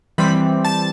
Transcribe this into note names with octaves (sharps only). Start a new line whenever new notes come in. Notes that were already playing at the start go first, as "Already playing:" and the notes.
E3 G3 C4 B5
A5